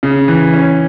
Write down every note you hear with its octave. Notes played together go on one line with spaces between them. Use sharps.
C#3
E3
C#4